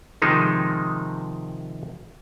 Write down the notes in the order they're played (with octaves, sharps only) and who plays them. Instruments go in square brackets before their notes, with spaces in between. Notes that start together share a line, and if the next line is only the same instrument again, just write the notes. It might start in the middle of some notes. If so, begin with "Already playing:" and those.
[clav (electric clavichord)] C3 D#3 F3 G#3 D#4